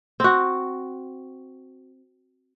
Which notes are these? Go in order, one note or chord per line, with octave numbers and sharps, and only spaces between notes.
C4 F#4